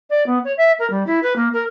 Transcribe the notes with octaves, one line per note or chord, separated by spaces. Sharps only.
D5
B3
C#5
E5
A#4
G3
E4
B4
A#3
A#4